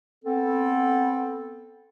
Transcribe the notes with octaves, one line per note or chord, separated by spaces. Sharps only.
B3 C4 A4